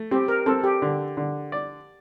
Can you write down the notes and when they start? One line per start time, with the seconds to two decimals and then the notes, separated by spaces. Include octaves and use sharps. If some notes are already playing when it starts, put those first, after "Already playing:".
Already playing: A3
0.11 C4 G4
0.28 A#4
0.46 C4 A4
0.64 G4
0.82 D3
1.17 D3
1.52 D5